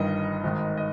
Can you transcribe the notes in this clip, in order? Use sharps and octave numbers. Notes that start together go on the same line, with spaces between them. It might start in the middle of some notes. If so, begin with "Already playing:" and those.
Already playing: G1 G2 D#3 D#5
G#1 G#2 D#3
D#5